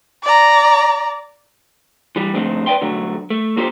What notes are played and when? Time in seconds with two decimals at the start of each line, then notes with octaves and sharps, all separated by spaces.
0.23 D5 A#5
2.16 E3 G3
2.33 F2 G#2 D3 F3 A3 C4
2.66 B4 D5 D#5 F5 G5 C6
2.81 B1 D3 F#3 A3
3.30 A3
3.57 A#3 F4 G4 A4 B4 C5